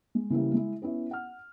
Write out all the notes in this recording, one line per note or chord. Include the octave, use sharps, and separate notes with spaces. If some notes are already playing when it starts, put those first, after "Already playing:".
G#3
C#3 E3 G3 A#3 E4
G#3 E4
B3 C#4 E4
F#5 F6